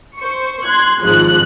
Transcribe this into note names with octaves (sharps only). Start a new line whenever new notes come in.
C5 C#6
C6 F#6 G#6
G#1 G#2 F3 F#6